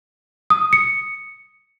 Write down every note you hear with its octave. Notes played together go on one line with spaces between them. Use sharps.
D#6
C#7